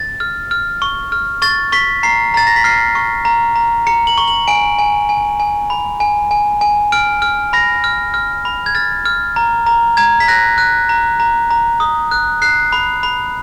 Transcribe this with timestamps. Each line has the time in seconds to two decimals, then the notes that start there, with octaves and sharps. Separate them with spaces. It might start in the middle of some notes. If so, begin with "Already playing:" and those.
Already playing: A6
0.20 F6
0.51 F6
0.82 C#6
1.12 F6
1.42 C#6 A6
1.72 C#6 B6
2.03 A#5 C7
2.34 A#5 A6
2.47 A#6
2.56 B6
2.64 F6 C7
2.95 C#6
3.25 A#5
3.56 A#5
3.87 A#5 C#7
4.07 F#7
4.18 C#6
4.28 F#7
4.48 G#5 D7
4.79 G#5
5.09 G#5
5.40 G#5
5.70 B5
6.00 G#5
6.31 G#5
6.61 G#5
6.92 F6 D7
7.22 F6
7.53 B5 A#6
7.84 F6
8.14 F6
8.45 B5
8.66 G#6
8.75 F6 A6
9.05 F6
9.36 A#5
9.67 A#5
9.97 A#5 G#6
10.20 B6
10.28 F#6 A#6
10.58 F#6
10.89 A#5
11.20 A#5
11.51 A#5
11.80 D#6
12.11 F#6
12.42 F#6 C7
12.72 B5
13.03 B5